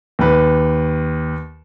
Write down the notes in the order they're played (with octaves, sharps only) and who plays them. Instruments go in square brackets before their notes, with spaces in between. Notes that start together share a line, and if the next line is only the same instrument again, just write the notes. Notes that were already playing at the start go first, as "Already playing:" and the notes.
[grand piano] D#2 B4